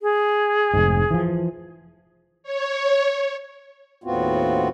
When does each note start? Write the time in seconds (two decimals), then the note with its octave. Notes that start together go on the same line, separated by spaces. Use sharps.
0.02 G#4
0.74 F1 G#2
1.11 E3 F3
2.43 C#5
4.04 D#2 A2 B3 C4 F4 F#4